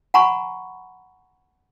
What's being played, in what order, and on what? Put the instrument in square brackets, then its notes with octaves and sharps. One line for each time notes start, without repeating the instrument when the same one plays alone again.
[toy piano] F#5 G#5 A#5 B5 C#6